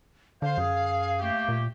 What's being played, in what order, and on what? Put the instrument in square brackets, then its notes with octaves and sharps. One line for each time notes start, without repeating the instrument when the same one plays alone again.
[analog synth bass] D3 [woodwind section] C5 [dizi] F5
[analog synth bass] F#2 [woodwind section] G#4
[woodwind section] A3 A#3 G4
[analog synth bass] A#2